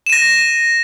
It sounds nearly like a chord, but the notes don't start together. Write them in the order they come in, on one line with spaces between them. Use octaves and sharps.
E7 D#7 A#6